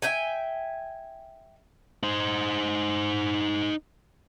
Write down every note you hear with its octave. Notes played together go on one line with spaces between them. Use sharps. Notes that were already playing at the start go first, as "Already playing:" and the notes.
E5 G5 G#5
D#4 C5